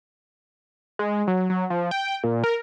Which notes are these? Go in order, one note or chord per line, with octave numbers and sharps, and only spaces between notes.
G#3
F#3
F#3
F3
G5
A#2
A#4